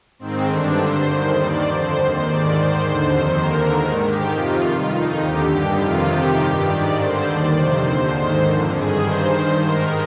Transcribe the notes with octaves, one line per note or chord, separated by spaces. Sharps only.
G#2 D#3 C4
G2 D3 D4
G2 D3 C5
D#2 D#3 C5
G2 D#3 D5
F2 D3 C5
D#2 D#3 C5
G#2 D#3 D5
G#2 D#3 C5
D#2 D3 C5
F2 D#3
D#2 D3 A#4
G#2 D#3
G#2 D#3 G4
F2 C3 D#3 F4
G2 D#3 F4
F2 D#3 D#4
D#2 D3 G4
G2 D3 G4
F2 C3 D#3 F4
F2 C3 D#3 G4
G2 D#3 G4
G#2 D#3 D5
G2 D3 C5
D#2 D#3 D5
F2 C3 D#3 C5
D#2 D3 C5
G#2 D#3 C5
F2 D3
G2 D#3 G#4
G2 D#3 C5
G2 D#3
G#2 D#3 A#4